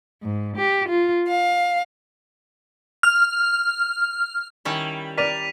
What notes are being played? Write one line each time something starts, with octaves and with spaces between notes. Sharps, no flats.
G#2
G4
F4
F5
F6
D#3 G3 C#4 E4
A#4 D5 B6 D#7 F7